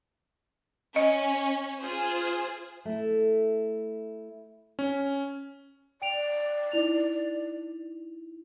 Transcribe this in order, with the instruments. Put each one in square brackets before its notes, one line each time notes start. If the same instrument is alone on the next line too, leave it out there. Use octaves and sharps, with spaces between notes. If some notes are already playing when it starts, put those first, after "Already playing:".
[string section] C#4 [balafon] D#5
[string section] F4 G#4 C5
[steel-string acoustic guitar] A3 E4
[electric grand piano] C#4
[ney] D5 [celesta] G5 D7 F7
[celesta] D#4 E4 F7